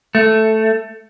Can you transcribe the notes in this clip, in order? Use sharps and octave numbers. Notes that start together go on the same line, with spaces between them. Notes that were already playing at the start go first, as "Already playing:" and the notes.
A3